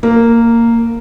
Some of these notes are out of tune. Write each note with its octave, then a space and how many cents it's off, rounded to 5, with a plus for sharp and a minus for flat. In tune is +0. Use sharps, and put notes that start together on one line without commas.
A#3 -10